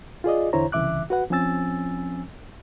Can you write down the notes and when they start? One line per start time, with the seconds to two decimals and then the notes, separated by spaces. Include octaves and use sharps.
0.24 F4 G#4 D5 D#5
0.53 E2 D3 E4 C5 C#5 A#5
0.72 C2 C#3 E3 E5 D6 F#6
1.10 F#4 B4 F#5
1.30 F3 C4 C#4 G#5 E6 A6